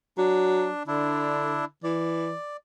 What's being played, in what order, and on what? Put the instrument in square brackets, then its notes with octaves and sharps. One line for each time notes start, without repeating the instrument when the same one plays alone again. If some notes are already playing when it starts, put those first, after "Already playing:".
[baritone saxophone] F#3 [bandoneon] D4
[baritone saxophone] D3 [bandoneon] D4 E4
[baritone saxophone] E3 [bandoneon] D5